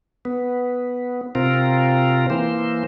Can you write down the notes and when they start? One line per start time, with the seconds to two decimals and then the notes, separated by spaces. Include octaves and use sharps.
0.25 B3
1.35 C3 C4 F4 A#4
2.30 E3 A#3 C5